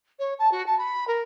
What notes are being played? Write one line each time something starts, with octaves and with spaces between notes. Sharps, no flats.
C#5
A5
F#4
A5
B5
A#4